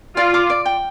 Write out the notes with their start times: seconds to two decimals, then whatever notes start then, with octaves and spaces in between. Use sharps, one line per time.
0.17 F4 D5
0.34 D6
0.50 D5
0.66 G5